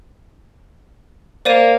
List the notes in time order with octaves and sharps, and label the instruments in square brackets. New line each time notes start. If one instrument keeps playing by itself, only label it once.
[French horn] A#3 [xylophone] C5 D5 D#7